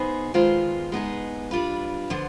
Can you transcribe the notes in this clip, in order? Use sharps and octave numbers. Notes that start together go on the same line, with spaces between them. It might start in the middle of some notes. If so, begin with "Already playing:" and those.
Already playing: B3 D#4 G#4 C5
D#3 G#3 B3 F4 C5
G#3 B3 D#4 G#4
G3 D4 F4 B4
D3 F3 B3